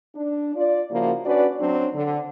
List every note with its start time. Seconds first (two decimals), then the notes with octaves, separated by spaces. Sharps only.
0.15 D4
0.55 F4 D5
0.91 C#3 F3 A#3 E4 F#4
1.24 C#4 D4 F#4 B4 D5
1.59 F#3 C4 D4
1.94 D3